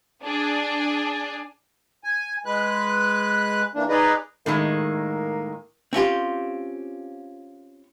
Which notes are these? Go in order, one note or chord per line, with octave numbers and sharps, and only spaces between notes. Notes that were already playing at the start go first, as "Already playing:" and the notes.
D4 G#4
G#5
G#3 B4 F#6
E3 A#3 D4
D#4 G#4 B4 D5 D#5
A2 D#3 G#3 A#3
C4 C#4 F4 G4